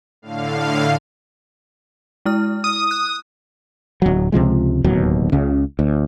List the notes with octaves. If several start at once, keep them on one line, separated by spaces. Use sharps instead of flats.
A2 D3 F5
G#3 E4 F6
D#6
F#6
D1 F#3
C#2 C3 F3 G#3
D1 D#2 B2 F#3
C#2 C#3
D2